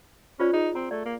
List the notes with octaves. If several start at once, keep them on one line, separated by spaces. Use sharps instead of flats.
C#4 F4 C5 D5
D#4 G#4
C4 A#5
A3 D5
A#3